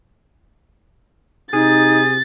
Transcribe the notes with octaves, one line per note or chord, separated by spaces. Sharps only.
C3 D#4 G#4 A6